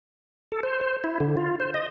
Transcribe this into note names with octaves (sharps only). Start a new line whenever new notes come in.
A4
C5
C5
E4
D3
F4
C5
D#5